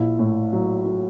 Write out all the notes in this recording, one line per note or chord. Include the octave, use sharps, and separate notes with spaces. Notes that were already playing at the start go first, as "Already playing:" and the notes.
Already playing: A#1 E4
A2
F#3
F#3